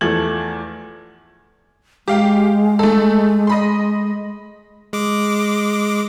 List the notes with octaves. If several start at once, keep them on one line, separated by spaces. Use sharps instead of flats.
E2 F3 A3 G#6 F#7
G#3 G4 F5 G5
A3 A4
D#5 B5 C6
G#3 D6